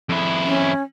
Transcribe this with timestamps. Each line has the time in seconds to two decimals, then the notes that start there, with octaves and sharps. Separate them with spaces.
0.09 F2 E4
0.45 C#4